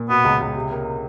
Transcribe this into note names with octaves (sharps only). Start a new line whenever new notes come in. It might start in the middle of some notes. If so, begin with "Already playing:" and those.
Already playing: A#2
B2 B3
C#2
C#2
C3
A#3